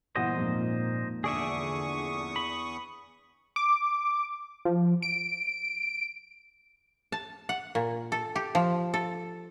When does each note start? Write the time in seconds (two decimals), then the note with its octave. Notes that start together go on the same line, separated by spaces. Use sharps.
0.15 G1 A#2 E3 C5 D#5 F#5
0.36 F2 G#2 A#3
1.24 E2 D3 G#4 D5 E5 C#6 D#6
2.36 B5
3.56 D6
4.65 F3
5.02 D7
7.12 A5
7.49 F#5
7.75 A#2
8.12 A4
8.36 G4
8.55 F3
8.94 A4